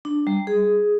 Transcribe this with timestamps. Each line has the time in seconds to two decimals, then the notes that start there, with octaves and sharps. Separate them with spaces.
0.05 D4
0.27 G3
0.47 G#4